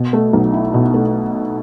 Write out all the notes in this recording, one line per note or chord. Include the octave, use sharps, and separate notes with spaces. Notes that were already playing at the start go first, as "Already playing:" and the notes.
Already playing: B2
A3
B1
E4
B2
A3